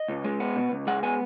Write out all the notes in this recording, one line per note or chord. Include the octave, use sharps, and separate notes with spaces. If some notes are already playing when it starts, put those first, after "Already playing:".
Already playing: D#5
C#2
G#3
B3
B2
C#2
G#3 F#5
B3 G#5